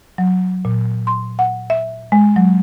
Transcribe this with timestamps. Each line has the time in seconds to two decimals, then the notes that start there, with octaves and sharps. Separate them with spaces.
0.18 F#3
0.65 A#2
1.07 C6
1.39 F#5
1.70 E5
2.12 G#3
2.36 F#3